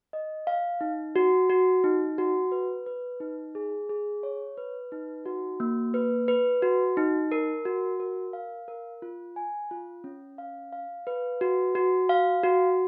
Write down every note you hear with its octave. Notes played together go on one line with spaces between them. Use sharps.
D#5
F5
D#4
F#4
F#4
D#4
F#4
B4
B4
D#4
G#4
G#4
C#5
B4
D#4
F#4
A#3
B4
B4
F#4
D#4
A#4
F#4
A#4
F5
A#4
F4
G#5
F4
C#4
F5
F5
B4
F#4
F#4
F5
F#4